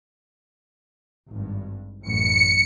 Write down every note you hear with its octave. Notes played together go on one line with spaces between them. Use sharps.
G#1 G2
A1 F#2 C#7